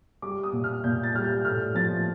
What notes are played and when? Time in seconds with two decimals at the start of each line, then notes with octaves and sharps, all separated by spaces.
0.22 G3 D6
0.43 D#6
0.53 A#2
0.64 F6
0.84 A#2 G6
1.03 A6
1.14 G3 F6
1.24 G6
1.45 A2 F6
1.75 F3 A6